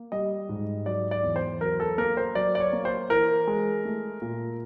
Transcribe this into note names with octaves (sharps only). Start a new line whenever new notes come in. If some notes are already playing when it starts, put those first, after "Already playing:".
Already playing: A#3
G3 D#5
G#2
F#3 D5
D5
E2
C5
F#3 A#4
A4
A#3 A#4
C5
F#3 D5
D5
C#5
A#3
C5
E3 A#4
G#3
A3
A#2